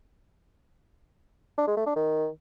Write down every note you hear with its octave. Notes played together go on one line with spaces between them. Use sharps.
D4
G#3
A3
D4
D#3